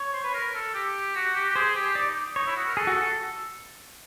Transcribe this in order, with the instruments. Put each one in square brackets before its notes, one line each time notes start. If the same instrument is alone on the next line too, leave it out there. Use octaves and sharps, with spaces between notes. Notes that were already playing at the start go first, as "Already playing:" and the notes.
Already playing: [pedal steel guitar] C#5
[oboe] C5
B4
A#4
A4
G4
F#4
G4
G4
[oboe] G#4 [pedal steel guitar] C5
[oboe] G4
[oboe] D#4 [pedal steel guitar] D5
[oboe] D#4 [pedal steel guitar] C#5
[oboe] E4
F#4
A#4
[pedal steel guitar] G#4 [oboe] A4
[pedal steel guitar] F#4